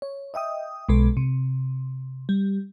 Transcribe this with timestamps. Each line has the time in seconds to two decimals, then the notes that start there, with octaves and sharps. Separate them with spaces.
0.02 C#5
0.34 D#5 E5 G5 D#6
0.89 B1 B2 G#3 A4
1.17 C3
2.29 G3